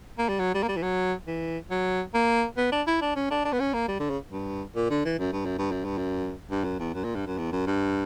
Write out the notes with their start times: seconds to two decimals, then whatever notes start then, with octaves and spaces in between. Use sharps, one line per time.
0.18 A#3
0.29 G3
0.39 F#3
0.54 G3
0.63 A#3
0.68 G3
0.77 E3
0.82 F#3
1.27 E3
1.71 F#3
2.14 A#3
2.57 B3
2.72 D4
2.87 E4
3.01 D4
3.16 C#4
3.31 D4
3.45 D4
3.52 B3
3.60 C#4
3.73 A#3
3.88 G3
4.00 D3
4.10 C#3
4.32 G2
4.75 A#2
4.90 D3
5.05 E3
5.19 F#2
5.33 G2
5.46 F#2
5.58 G2
5.71 F#2
5.85 G2
5.98 F#2
6.51 G2
6.64 F#2
6.79 E2
6.94 F#2
7.04 A#2
7.15 G2
7.27 F#2
7.38 E2
7.52 F#2
7.66 G2